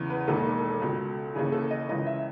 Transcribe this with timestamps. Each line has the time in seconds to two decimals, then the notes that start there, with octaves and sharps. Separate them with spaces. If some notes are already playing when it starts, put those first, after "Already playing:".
Already playing: E2 C#3 E3
0.10 B4
0.28 E1 D#2 D#3 A4
0.82 C#2 B2
1.35 D#2 C#3 E3 G#4
1.52 A4
1.71 D#5
1.89 C#2 C#3 E3 D#5
2.06 E5